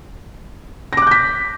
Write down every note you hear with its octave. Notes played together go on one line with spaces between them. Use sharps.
D6 F#6 G6 A#6 B6